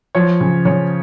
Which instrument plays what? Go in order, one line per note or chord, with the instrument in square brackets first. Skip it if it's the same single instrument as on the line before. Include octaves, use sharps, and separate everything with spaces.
[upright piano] F3 C#5
C#3
C#3 C#5